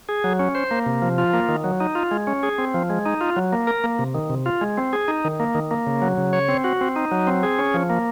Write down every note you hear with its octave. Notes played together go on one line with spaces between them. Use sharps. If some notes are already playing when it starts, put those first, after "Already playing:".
G#4
F#3
C#4
C5
A#3
C3
F3
F4
A#3
D#3
F#3
D#4
F4
G#3
C#4
G#4
C4
F3
G#3
D#4
F4
F#3
A#3
A#4
A#3
C3
D#3
C3
F4
G#3
C4
G#4
D#4
D#3
A#3
D#3
A#3
C#3
F#3
C#3
C#5
C4
F#4
C4
D#4
F#3
C4
G#4
C#4
F3
A#3